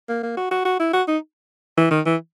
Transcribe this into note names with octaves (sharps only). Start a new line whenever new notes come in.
A#3
A#3
F#4
F#4
F#4
E4
F#4
D#4
E3
D#3
E3